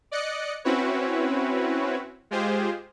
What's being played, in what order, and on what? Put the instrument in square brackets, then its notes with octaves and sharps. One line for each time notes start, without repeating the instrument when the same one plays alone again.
[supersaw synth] D5 D#5 F#6 C#7
C4 C#4 E4 F#4 B4 C#5
G#3 F4 G4 G#4 C5